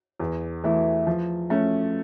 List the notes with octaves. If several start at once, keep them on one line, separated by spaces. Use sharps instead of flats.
E2
E3 A3 E4
F3
A3 C#4